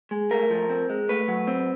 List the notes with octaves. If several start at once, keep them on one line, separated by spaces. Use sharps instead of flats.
G#3
A3 A#4
F3
C4
G#3
A3 B4
F#3
C4